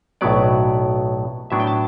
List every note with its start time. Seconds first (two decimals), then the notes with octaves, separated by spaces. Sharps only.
0.21 B1 A2 F#3 B3 D5
1.50 A2 F#3 B3 D4 E5
1.60 G5
1.67 A5